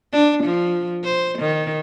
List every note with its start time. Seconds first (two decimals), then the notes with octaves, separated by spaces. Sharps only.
0.13 D4
0.44 F3
1.04 C5
1.39 D#3